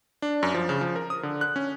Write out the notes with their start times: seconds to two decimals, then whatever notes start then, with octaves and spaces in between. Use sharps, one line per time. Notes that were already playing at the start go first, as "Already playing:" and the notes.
0.22 D4
0.43 F#2
0.54 F3
0.69 C#3
0.81 F3
0.96 A#4
1.10 D#6
1.23 D3
1.41 F#6
1.56 C#4